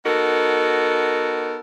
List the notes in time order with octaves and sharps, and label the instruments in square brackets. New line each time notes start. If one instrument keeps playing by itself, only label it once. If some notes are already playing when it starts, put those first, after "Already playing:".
[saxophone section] B3 D#4 F#4 A4 A#4